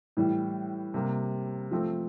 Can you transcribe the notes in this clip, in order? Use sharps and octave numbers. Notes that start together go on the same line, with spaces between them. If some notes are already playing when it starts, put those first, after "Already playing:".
A2 E3 G3
C3 G3 A#3
F3 A3 C4